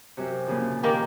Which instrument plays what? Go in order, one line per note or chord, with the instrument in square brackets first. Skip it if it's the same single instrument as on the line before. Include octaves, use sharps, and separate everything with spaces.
[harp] F#2 C3
A#2 C#3 F3
[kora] D#3 A#3 G4